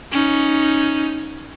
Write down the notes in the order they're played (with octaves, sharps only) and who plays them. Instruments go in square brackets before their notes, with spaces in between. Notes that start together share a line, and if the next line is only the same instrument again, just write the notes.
[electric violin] C#4 D#4